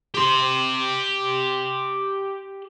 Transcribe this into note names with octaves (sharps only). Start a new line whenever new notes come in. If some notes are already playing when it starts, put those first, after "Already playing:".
G4 C6